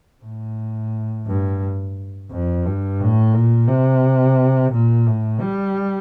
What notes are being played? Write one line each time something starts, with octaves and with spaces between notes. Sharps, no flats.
A2
G2
F2
G2
A2
A#2
C3
A#2
A2
G3